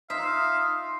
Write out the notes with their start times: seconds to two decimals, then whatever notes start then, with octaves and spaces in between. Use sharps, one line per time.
0.10 D#4 F4 E5 F5